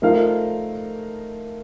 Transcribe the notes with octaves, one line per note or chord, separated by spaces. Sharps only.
F3 A3 D#4 A#4 F5